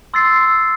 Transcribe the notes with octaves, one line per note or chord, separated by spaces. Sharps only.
C6 E6 A6 C7